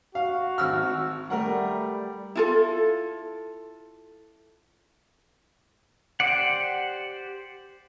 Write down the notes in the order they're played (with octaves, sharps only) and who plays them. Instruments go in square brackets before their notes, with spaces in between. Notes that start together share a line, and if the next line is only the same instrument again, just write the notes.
[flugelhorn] F#4 [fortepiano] F5
[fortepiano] G#1 E6 F6
[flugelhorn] G3 [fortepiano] A3 A#4 F#5
[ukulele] E4 F4 A4
[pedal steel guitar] G4 C5 D5 F#5